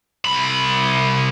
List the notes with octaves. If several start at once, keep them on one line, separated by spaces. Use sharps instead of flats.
C2 B5